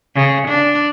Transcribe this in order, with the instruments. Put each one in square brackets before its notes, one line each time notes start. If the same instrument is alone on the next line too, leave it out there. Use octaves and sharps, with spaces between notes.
[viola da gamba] C#3
D4